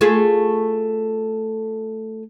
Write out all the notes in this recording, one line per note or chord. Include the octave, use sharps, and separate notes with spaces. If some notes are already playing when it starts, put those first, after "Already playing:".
A3 F4 G#4